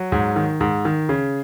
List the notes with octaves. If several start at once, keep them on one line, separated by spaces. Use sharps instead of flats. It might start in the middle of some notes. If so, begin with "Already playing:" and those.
Already playing: F#3
G#2
D#3
G#2
D#3
C#3